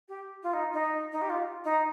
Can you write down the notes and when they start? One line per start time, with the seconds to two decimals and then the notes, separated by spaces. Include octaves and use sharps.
0.08 G4
0.43 F4
0.53 D#4
0.73 D#4
1.12 D#4
1.21 G4
1.29 F4
1.64 D#4